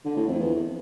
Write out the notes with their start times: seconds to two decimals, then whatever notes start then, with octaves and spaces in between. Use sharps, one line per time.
0.05 D3
0.16 A2
0.28 F2
0.39 E2